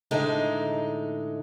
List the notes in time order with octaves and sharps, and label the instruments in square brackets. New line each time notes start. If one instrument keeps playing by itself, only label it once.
[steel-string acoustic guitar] A2 D3 G#3 D#4